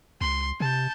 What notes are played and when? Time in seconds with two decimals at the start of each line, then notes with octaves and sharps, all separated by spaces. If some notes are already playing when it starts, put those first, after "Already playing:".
0.21 C#2 C6
0.60 C3 A5 G6